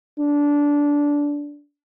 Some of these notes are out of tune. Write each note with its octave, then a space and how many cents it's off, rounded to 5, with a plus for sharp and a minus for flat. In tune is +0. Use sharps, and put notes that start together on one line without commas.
D4 -15